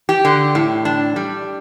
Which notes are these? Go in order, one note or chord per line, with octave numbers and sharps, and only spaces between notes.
G4
D3
A2
D4
G3